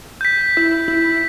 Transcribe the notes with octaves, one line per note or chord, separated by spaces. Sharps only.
G6 B6
E4
E4